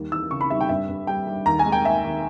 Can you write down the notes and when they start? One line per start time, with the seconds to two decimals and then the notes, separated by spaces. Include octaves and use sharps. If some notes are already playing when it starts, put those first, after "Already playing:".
Already playing: D#2 G3
0.12 E3 E6
0.31 C#3 C#6
0.41 B5
0.50 G3 E5
0.61 G5
0.69 G2 E5
0.89 G2
1.07 G3 G5
1.27 G3
1.46 D#2 A#5
1.59 G#5
1.66 G#3
1.72 G5
1.85 D#3 E5
2.04 D#2